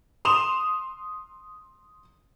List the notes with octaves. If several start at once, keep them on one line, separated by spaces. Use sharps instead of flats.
C6 D#6 E7 F7